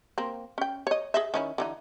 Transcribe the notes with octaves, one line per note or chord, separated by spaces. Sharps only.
A#3 C4
C#4 G5
C#5 D#5
G#4 D#5 E5
D#3 C#4 E4
D3 E3 D#4